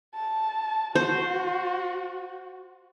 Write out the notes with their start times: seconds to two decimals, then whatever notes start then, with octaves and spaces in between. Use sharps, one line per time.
0.15 A5
0.95 F#4 C5